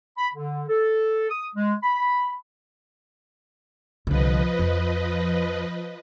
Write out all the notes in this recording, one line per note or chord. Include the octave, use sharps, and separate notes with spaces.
B5
D3
A4
D#6
G#3
B5
C2 D3 F3 B4 D#5
F2